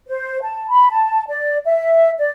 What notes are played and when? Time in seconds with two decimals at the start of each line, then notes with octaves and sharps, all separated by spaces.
0.08 C5
0.42 A5
0.70 B5
0.91 A5
1.28 D5
1.66 E5
2.19 D5